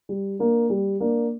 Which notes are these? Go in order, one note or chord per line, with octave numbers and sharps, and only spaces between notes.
G3
A#3 D4
G3
A#3 D4